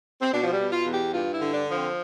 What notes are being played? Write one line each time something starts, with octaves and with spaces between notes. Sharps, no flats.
C4
B2 D4
F3
G3
B2
F4
E2
G4
G2 F4
E4
D3
D4
F3
C4